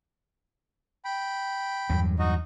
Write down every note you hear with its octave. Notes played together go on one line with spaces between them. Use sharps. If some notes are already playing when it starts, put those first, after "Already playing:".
G5 B5
E2 G2 F#3
D#4 F#4 D#5